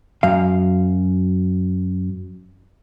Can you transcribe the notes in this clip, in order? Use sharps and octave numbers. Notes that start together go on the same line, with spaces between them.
F#2 F5